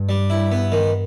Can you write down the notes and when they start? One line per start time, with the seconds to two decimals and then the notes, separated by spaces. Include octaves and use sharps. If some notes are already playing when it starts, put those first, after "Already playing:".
Already playing: G2
0.09 G3
0.30 E4
0.51 B3
0.72 D#3